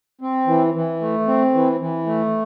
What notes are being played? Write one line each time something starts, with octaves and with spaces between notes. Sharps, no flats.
C4
E3
E3
A3
C4
E3
E3
A3